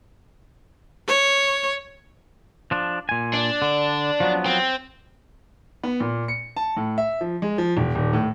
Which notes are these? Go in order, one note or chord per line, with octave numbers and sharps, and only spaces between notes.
C#5
F3 D4
A#2 G#5
D4
D3
F3 F#3 B3
C4
B3
A#2
C#7
A5
A2
E5
F3
G#3
F3
E1
D#1
A2